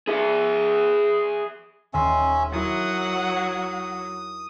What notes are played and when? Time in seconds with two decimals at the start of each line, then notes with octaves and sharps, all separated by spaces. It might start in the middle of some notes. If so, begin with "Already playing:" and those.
0.08 G#4 E5
1.94 D#1 C#4 E5 C6
2.53 F#3 E4 A#4 F#5 D#6